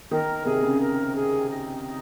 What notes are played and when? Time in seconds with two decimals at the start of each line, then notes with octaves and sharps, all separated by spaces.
0.11 D#3 A#4
0.45 C3 G#4
0.63 C#3
0.80 A#4
1.15 G#4
1.49 D#4
1.83 D#4